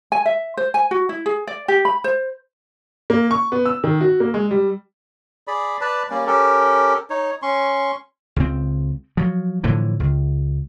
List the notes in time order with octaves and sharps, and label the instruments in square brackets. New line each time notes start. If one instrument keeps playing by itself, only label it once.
[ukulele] G#5
E5
C5
G#5
F#4
E4
G#4
D5
G4
B5
C5
[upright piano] A#3
C#6
B3
E6
D#3
F#4
A#3
G#3
G3
[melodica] G#4 D5 B5
B4 D5 A5 B5
G3 A#3 C#4 D5
C#4 G4 A4 A#4
D#4 C#5
C#4 C6 C#6
[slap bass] C#2 C#3 C4
F3 F#3
A2 D3 E3 F3
C#2